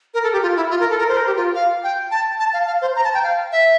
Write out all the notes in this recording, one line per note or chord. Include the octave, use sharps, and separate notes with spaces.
A#4
A4
G4
F4
E4
F4
A#4
A4
A#4
C5
A#4
G4
F4
F5
G5
A5
A5
F5
F5
C5
A#5
A5
G5
F5
E5